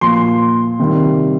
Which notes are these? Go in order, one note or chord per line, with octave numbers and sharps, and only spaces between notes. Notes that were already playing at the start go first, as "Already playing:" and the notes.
A#2 F3 C6
C3 D#3 G3